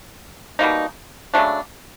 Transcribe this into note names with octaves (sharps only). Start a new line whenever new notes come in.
B2 G3 A#3 D#4
C#3 F#3 A3 D4